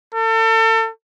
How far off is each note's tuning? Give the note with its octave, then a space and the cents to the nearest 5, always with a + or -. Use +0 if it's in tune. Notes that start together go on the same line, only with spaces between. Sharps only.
A4 +35